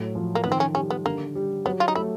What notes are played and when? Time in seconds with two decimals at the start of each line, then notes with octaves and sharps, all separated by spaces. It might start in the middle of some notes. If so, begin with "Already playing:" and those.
Already playing: A2 F#3
0.15 F3
0.35 A#3
0.44 D#3 B3
0.52 C4
0.60 C#4
0.75 G3 C#4
0.90 B3
1.06 D3 A#3
1.35 G3
1.65 F#3 B3
1.80 F4
1.88 D#4
1.95 A3 E4